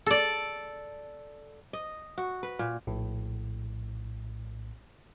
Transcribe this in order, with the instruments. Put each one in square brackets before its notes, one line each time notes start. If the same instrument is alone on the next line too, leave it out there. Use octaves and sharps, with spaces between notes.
[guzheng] A4 D5
[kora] D#5
F#4
B4
A#2
[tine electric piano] A#1 A2